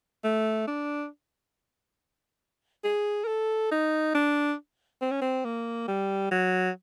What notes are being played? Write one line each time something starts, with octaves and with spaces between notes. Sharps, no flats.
A3
D4
G#4
A#4
A4
D#4
D4
C4
C#4
C4
A#3
G3
F#3